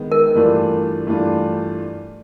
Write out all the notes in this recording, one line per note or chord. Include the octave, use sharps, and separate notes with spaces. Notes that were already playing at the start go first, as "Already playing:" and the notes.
Already playing: D#3 G#3 B3
A#4
G2 E3 A3 D4 F4
G2 E3 A3 D4 F4